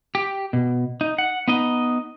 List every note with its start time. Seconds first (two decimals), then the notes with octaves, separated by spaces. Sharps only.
0.15 G4
0.53 B2
1.01 D#4
1.18 F#5
1.48 B3 D#4 D#5